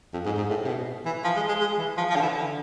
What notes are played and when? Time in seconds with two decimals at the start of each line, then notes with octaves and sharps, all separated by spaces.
0.13 F2
0.26 G#2
0.38 G#2
0.49 A2
0.64 C3
0.68 B2
1.06 E3
1.24 F3
1.36 G#3
1.48 G#3
1.60 G#3
1.79 E3
1.97 F3
2.10 F3
2.16 D3
2.21 E3
2.35 D3